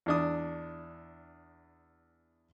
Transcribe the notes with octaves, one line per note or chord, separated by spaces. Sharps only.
E2 D4 D#6